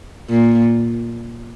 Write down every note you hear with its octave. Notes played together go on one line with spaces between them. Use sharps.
A#2